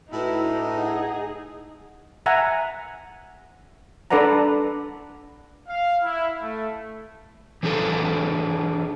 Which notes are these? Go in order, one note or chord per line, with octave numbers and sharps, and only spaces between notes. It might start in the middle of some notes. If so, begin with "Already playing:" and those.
A2 D#4 E4 F#4 B4
D4
G#4 F#5
E5 F#5 G#5 A#5
D4 A4 B4 D5 F#5 A#5
F5
E4
A3
E3 D4 G#4 A4